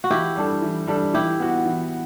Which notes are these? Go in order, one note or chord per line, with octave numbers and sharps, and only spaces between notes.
F#4
E3 E4 G4
G3 D4 A4
E3
G3 D4 A4
E3 E4 G4
B3 F#4
E3